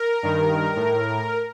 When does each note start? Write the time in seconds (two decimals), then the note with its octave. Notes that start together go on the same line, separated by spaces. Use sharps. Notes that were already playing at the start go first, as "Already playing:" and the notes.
Already playing: A#4
0.23 G2 D#3
0.76 A2